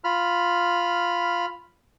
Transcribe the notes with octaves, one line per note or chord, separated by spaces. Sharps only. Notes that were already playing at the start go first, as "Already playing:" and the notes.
F4 B5 F6